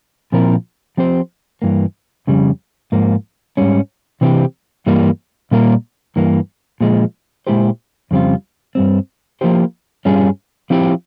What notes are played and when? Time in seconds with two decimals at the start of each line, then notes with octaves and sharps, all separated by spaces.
0.32 A#2 F3 C4 E4 A#4
0.97 F3 C4 G4 C5
1.62 G2 E3 A#3
2.27 F2 C#3 G3
2.92 G#2 F3 A#3
3.57 G#2 G3 C#4
4.21 C3 E3 C4 G4
4.86 G2 E3 G3 A#3
5.51 A#2 G3 A#3 F4 A#4
6.16 G2 E3 A#3
6.81 A#2 F3 G#3
7.47 A#2 G#3 E4 G4 C5
8.11 F2 C#3 G3 C4 F4
8.75 G2 G3 C4
9.41 F3 A#3 E4 G4 C5
10.05 G2 G3 C#4 F4 G#4
10.70 F3 C4 E4 G4